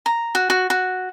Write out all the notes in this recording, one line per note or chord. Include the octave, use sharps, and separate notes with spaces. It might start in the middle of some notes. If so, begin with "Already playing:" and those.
A#5
F#4
F#4
F#4